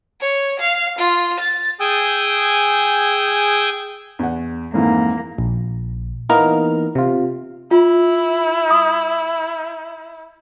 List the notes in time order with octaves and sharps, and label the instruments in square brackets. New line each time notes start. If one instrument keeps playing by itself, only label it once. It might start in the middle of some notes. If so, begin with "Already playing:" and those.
[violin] C#5
F5
F4
A6
[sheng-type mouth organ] G#4 G5 G#5 D#6 E6 G6
[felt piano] E2 F#5
[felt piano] F2 G#2 E3 [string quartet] A#3
[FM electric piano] A#1
E3 A#3 B3 D#4 A#4 F6
C3 F4
[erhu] E4 [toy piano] F4
[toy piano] D#6